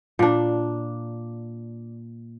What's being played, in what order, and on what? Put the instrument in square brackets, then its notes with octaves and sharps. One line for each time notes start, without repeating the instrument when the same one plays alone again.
[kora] A#2 D4